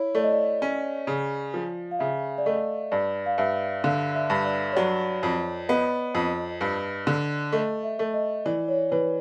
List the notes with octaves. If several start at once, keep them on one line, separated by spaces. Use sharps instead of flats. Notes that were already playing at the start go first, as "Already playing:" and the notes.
Already playing: E4 C#5
A3 D5
D#5
D5
C#4
C#3
F3
F5
C#3 E5
D5
A3 D#5
G2 D5
F5
G2 E5
D3 F5
E5
G2
D5
C#5
F#3 D5
F2
B3 D#5
F2
G2
D3
A3 D#5
E5
A3
D#5
E3 D5
C#5
E3 B4